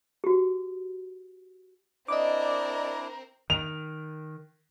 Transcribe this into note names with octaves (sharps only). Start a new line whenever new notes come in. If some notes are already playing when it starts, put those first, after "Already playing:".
F#4 G4
C4 D4 E4 A#4 D5 D#5 D6
D#3 F7